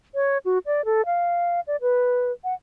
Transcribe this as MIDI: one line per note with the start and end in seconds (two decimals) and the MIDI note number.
0.15 0.38 73
0.45 0.58 66
0.66 0.85 74
0.85 1.05 69
1.06 1.60 77
1.67 1.76 74
1.82 2.32 71
2.44 2.54 78